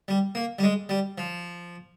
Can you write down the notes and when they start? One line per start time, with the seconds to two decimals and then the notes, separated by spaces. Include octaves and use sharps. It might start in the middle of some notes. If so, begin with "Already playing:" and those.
0.08 G3
0.35 A#3
0.59 G3
0.63 G#3
0.89 G3
1.18 F3